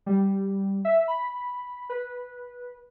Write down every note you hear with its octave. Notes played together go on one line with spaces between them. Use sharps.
G3
E5
B5
B4